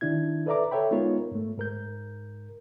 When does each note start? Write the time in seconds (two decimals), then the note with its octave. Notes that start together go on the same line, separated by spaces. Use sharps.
0.01 D#3 D4 E4 G#6
0.46 A4 B4 D5 E5 A#5 D6
0.71 A4 C#5 E5 G5 B5
0.91 G#3 B3 D#4 F4 A#4 C#5
1.31 G#2 A3
1.57 G#2 A#4 G6